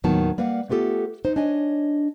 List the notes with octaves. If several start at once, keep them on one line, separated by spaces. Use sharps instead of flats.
D#2 A2 D#3 F#3 B3 A5
G3 A#3 B4 F5 F#5
A3 B3 F4 G4 A4
D#4 C5
D4 C#5 D#5 G#5